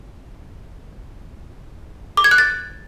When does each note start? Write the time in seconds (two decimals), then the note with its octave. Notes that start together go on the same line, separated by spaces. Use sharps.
2.17 D6
2.24 G#6
2.31 F#6
2.38 A6